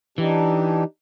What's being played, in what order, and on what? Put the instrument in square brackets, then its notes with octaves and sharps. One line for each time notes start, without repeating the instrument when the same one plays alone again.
[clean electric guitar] E3 [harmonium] D4 D#4 G4